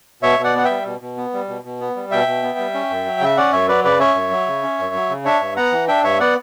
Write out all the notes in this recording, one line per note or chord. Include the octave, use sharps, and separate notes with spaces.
B2 C#5 E5
B2
D5 F#5
B3 F#5
E5 G5
G3
B2
B2
B3
G3
B2
B2
B3
G3
B2 E5 G5
B2
B3
G3
C#4
F#2
F#3
C#3 E5
C#4 D5 F#5
F#2 C#5 E5
F#3 B4 D5
C#3 B4 D5
C#4 C#5 E5
F#2
F#3
C#3
C#4
F#2
F#3
C#3
D4 C#5 E5
G2
B3 F#5 A#5
E3
D4 E5 G5
G2 C#5 E5
B3 D5 F#5